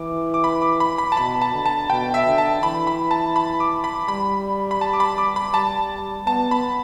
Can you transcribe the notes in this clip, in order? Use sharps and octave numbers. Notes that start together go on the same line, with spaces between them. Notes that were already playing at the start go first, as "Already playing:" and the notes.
Already playing: E3 D6
D6
B5
D6
B5
B5
A5
B2 B5
A5
D3
A5
B2 G5
E5
D3
A5
E3 B5
B5
A5
B5
D6
B5
G3 B5
B5
A5
D6
B5
D6
B5
G3 A5
B3 A5
B5